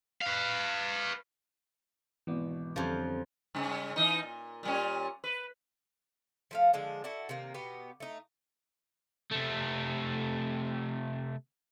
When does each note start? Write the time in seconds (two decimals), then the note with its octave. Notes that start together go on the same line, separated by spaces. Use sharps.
0.21 B4 F5
2.27 G#1 B2 E3 B3
2.76 F2 D3 F3 G3 C#4
3.55 G2 C#3
3.96 E3 D#4
4.23 A#2
4.63 A#2 G3 C#4
5.24 B4
6.51 F3 A3 F5
6.73 D3 F3 G#3 D4
7.04 E4 F#4 A4 D5
7.29 C3 D#3 A#3
7.54 B2 B3 G4
8.00 A3 D#4
9.32 C3 A3